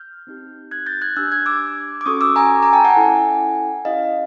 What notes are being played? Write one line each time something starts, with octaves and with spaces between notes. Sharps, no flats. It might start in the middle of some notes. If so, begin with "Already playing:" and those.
Already playing: F6 G6
C4 D#4 G4
F#6 G#6
G6 A6
F#6 G#6
D4 G4 E6 F#6
F#6 G#6
D6 E6
D6
C#4 F#4 A4 C#6 D#6
D6 E6
G#5 A#5
G#5 A#5
G5 A5
F#5 G#5
C#4 E4 A4
C#4 E4 G4 D#5 F5